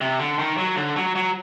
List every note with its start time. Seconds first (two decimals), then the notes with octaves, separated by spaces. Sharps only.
0.01 C3
0.19 D3
0.39 D#3
0.58 F#3
0.76 D3
0.96 F#3
1.15 F#3